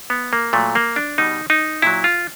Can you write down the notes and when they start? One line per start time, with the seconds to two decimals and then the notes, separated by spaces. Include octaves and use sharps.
0.10 B3
0.33 A#3
0.53 A#2 F#3 A3
0.75 A#3
0.96 D4
1.18 B2 G3 D#4
1.50 D#4
1.82 A#2 F#3 E4
2.04 F4